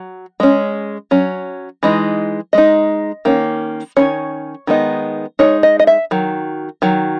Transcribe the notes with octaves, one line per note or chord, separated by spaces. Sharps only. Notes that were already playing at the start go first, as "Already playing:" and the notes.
Already playing: F#3
G#3 C#4
F#3 C#4
E3 G#3 D#4
G#3 D#4 D#5
D#3 A#3 C#4
D#3 A#3 C#4 C#5
D#3 G#3 B3 D#4
G#3 D#4 C#5
D#5
D#5
E5
D#3 F#3
D#3 F#3